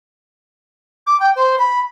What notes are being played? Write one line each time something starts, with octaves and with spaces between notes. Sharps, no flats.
D6
G5
C5
B5